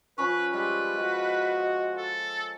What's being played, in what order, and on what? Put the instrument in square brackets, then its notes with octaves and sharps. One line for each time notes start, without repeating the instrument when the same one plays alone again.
[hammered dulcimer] F3 C#4 C#5 [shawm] B4
[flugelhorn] G3 [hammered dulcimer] G#3 [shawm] B4
[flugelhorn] F#4 [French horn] D#5
[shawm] A4